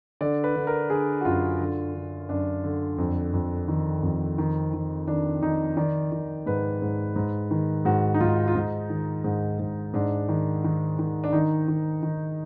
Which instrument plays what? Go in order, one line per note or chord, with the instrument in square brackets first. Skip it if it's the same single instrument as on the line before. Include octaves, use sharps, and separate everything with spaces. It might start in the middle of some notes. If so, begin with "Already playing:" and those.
[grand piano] D3 D5
B4
D3
A#4
D3 G#4
F#4
F#2 F4
D3
D3
F#2 D4
D3
F2
F2
D#3
F2
D#3
D#3
D#3 D4
D#3 D#4
D#3 D5
D#3
G#2 B4
G#2
G#2
D#3
G#2 F#4
D#4
G#2 F4
F4
G#2 D#4
D#3
G#2
G#2
G#2 D4
D#3
D#3
D#3
D4
D#3 D#4
D#3
D#3